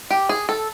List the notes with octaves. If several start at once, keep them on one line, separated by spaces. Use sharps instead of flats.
G4
G#4
A4